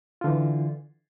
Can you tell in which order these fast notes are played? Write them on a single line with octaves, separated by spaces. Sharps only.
F4 D3 E3